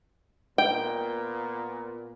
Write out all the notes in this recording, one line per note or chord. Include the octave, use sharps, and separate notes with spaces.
A#2 B3 G5